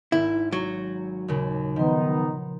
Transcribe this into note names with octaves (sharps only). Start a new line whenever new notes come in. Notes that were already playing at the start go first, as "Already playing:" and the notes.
G#1 E4
F#3
D#2 A#2 C#3
D#3 F3 B3 D#4 C6